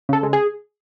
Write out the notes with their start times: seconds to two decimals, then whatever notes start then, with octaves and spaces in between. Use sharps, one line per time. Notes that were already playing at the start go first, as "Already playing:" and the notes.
0.09 C#3 A4
0.23 G#3
0.33 G#4